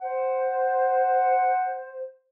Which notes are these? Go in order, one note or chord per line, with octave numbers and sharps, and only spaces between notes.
C5 F#5